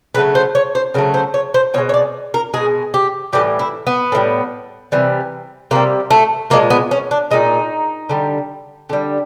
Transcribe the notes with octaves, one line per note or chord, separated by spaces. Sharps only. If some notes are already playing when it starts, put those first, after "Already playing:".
C#3 F#3 A3 B4
C5
C#5
C5
C#3 F#3 A3 A#4
C5
C#5
C5
B2 G#3 C#5
C#5
D5
A#4
B2 G#3 G#4
G4
A2 E3 G3 G4
E4
B3
A2 E3 G3
C3 E3 G3
C3 E3 G3 A#3
A3
A#2 F3 G#3 A#3
B3
C#4
D4
A#2 F3 G#3 D#4
D3 G3
D3 G3